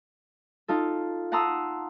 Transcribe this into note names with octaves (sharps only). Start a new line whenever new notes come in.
D#4 F4 A4
F#5 A5 A#5 C6 D#6 E6